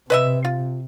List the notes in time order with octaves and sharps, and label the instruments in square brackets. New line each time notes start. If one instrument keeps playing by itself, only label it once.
[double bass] C3 [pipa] B4 D#5 E5
[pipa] F4